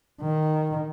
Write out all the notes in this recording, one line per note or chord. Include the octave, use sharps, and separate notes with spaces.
D#3